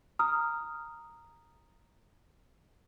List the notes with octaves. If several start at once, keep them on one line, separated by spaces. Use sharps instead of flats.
A#5 D#6 F6